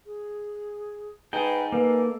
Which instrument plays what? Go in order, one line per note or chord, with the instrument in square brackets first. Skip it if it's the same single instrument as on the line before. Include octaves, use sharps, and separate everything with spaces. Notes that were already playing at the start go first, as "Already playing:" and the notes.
[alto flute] G#4
[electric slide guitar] D#4 G#4 [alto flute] B4 [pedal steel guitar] G5
[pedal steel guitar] A#3 [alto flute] A4 [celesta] B4